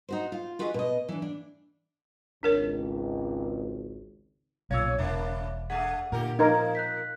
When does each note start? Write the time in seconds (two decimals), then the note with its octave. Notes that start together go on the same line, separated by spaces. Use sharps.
0.09 D#4 F#4 C5
0.32 F4
0.59 F4 F#4 G#4 B4 D#5
0.74 B2 D#5
1.09 E3 D4
1.22 D4
2.43 G#1 C#2 D4 A#4 C#5
4.71 B1 A#2 C#4 C#5 F5 E6
4.98 E1 C#3 A#3 D4 E5
5.70 A3 D4 G#4 F#5
6.12 A#2 D3 G4 A#4
6.39 B2 F3 A#3 D#4 A#4 G#6
6.75 F#6 G6 B6